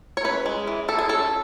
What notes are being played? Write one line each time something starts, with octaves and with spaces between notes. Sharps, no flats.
C#5
C#4 B4
G#3
E3
E3 A4
G#4
C#4 A4